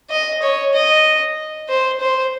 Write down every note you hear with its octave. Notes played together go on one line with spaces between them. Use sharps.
D#5
C#5
D#5
C5
C5